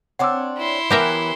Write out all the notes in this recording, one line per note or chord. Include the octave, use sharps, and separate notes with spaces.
C4 D4 C#5 F#5 D6 E6
E4 C6
E3 F#3 B3 G4 A#4 E5